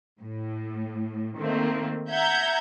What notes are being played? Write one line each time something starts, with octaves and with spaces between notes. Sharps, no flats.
A2
D#3 A3 A#3 C4
E5 F#5 A#5 G6 G#6